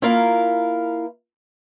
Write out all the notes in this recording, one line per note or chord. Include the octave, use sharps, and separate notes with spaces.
A#3 E4 F4 A#4 F5